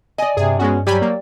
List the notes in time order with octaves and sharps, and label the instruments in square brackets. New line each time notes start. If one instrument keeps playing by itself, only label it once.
[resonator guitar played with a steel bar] D5 G#5 [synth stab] D#5
[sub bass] G2 [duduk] C3 [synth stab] G#4
[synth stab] G#3 B3 F#4 [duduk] C#4
[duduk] F#3 [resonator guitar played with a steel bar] G3 [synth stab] G4 G#5 B5
[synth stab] A#3